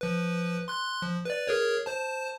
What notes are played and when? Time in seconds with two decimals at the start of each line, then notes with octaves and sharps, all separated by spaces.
0.01 F3 B4
0.68 C6 F#6
1.02 F3
1.25 B4 D5
1.47 G#4 A#4 C#5
1.86 C5 A5